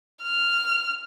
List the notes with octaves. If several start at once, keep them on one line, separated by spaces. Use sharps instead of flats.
F6